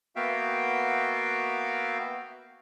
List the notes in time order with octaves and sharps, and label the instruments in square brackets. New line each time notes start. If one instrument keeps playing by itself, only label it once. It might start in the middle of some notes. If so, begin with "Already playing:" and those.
[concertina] A#3 B3 F#4 E5 F5 G5